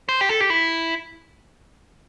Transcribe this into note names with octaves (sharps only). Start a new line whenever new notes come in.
C5
G4
A4
G4
E4